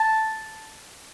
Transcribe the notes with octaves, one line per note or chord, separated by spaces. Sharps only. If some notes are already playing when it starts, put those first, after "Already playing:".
Already playing: A5